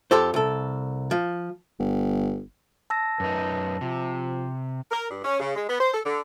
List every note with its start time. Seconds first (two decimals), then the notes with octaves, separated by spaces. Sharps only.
0.11 F2 G4 A4 C5
0.34 C2 A4
1.11 F3
1.79 G1
2.90 A5 E6 A#6
3.20 F#2 D#4 B4
3.81 C3 F3
4.91 A#4
5.10 G2
5.25 C#4
5.40 C#3
5.55 G#3
5.69 B3
5.80 C5
5.94 A4
6.05 D3